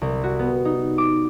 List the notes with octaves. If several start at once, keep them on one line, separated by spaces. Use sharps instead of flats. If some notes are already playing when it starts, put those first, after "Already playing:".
C2
F#4
B3
D#4
D6